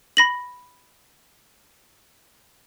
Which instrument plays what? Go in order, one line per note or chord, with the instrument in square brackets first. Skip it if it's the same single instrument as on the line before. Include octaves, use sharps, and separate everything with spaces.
[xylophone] B5 A#6 F#7